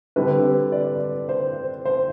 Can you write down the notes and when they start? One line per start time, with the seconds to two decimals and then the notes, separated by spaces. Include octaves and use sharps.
0.16 D3 G3 C4 B4
0.72 D5
1.29 C5
1.85 C5